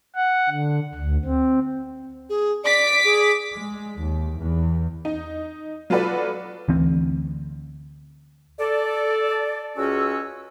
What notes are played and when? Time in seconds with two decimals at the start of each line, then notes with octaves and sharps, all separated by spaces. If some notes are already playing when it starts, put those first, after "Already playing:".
0.15 F#5
0.50 D3
0.94 D2
1.25 C4
2.29 G#4
2.64 D5 D6 B6
3.05 G#4
3.55 G#3
4.00 D#2
4.37 E2
5.05 D#4
5.90 F#3 F4 F#4 A4 B4 D5
6.68 D2 E3 C4
8.59 A4 D5
9.77 C#2 C#4 F#4 E6